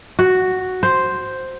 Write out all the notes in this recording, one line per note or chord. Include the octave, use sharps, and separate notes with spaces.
F#4
C5